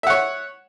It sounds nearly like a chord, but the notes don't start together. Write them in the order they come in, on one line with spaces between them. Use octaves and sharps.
E5 F#5 C#5